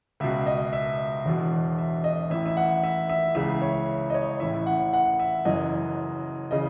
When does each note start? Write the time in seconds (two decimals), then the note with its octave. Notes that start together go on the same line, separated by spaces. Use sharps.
0.20 C#2 B2 E5
0.46 D#5
0.73 E5
1.25 E1 E2 B2
1.78 E5
2.04 D#5
2.30 A1 A2 E3 E5
2.46 E5
2.57 F#5
2.84 E5
3.09 E5
3.35 C#2 C#3 E3 E5
3.62 C#5
4.10 D#5
4.14 C#5
4.40 A1 A2 E3 E5
4.67 F#5
4.93 F#5
5.19 E5
5.45 F#1 F#2 E3 D#5
6.51 C#3 E3 D#5